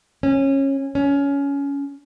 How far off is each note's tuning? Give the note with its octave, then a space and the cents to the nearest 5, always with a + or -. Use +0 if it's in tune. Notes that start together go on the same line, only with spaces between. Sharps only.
C#4 -20
C#4 +20